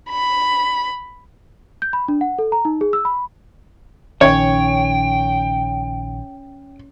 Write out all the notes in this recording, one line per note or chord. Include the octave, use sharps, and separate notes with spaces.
B5
G6
B5
D4
F#5
A4
A#5
D#4
G#4
E6
B5
A#1 D#3 C#4 C#5 G5